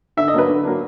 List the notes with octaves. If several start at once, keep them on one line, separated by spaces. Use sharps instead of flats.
D3 E5
D#5
F#3 A#3 D4 B4
D3
F#3 A#3 D4